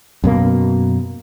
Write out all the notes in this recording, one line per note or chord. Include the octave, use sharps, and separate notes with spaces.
F#2 B2 A#3